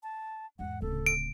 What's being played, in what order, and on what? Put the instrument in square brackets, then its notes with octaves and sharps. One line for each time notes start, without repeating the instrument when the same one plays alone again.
[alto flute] A5
[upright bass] E2 G#2 [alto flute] F#5
[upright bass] D1 C#3 [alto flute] A4
[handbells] D7